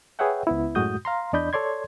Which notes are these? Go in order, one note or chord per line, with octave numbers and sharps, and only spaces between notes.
G#4 B4 C#5 E5 F#5 G5
C#2 B3 E4
F#2 A2 G#3 F#4 D#6 G6
F5 A#5 C6
E2 D4 D5 D#5 B5 G6
A4 C#5 D5 C6 G#6